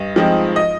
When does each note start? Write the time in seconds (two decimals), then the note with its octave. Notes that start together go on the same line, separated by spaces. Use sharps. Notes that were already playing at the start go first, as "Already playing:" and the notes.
Already playing: G2 D#5
0.16 F3 G#3 C4 D#4
0.56 D#5